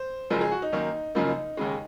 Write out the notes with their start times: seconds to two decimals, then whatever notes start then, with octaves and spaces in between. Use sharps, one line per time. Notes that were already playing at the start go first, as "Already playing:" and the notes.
Already playing: C5
0.30 F#1 F#2 F3 G#3 A#4
0.41 G#4
0.51 F#4
0.62 D#4
0.72 F#2 D#3 A#3
1.15 F#1 F#2 C#3 F3 A#3 D#4
1.57 D#2 C#3 G#3